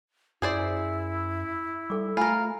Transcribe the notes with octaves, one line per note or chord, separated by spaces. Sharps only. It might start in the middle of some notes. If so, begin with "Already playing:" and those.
F#2 E4 G#4 C5 D5
G3 A4 D6
A3 F4 A#4 G#5 B5